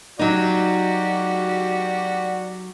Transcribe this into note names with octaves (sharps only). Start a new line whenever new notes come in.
F#3 D#4 F#4 G4 D5